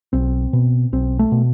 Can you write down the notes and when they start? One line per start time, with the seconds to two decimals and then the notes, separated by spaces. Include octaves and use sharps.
0.13 B1 C4
0.53 B2
0.92 B1 C4
1.19 A3
1.32 B2